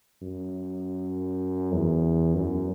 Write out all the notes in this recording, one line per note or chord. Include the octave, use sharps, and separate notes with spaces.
F#2
E2
F#2